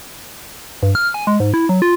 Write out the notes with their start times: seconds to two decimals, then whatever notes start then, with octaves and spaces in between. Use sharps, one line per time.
0.83 G2
0.95 F6
1.14 G#5
1.27 G#3
1.40 G#2
1.54 E4
1.69 F#3
1.82 F4